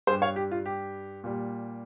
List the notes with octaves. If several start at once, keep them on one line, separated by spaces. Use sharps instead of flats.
G2 G3 G#4 C5
C#5 F5
G4
F4
G4
A#2 G3